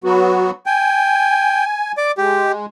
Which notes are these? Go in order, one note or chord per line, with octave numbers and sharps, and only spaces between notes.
F#3 B3 F#4
G5 G#5
D5 D6
G#3 G4